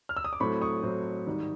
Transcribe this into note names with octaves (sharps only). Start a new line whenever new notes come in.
F6
E6
D#6
D6
A2 F#3 A3 C4 B5 C#6
C#6 D#6
A2 F#3 A3 C4
G#2 D#3 G3